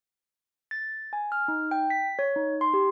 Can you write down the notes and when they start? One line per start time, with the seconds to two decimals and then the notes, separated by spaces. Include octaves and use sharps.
0.71 A6
1.13 G#5
1.32 F6
1.48 D#4
1.71 G5
1.90 B6
2.19 C#5
2.36 D#4
2.61 C6
2.74 G4